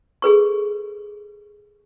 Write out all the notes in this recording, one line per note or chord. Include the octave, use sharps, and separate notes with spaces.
G#4 A4 B4 C#6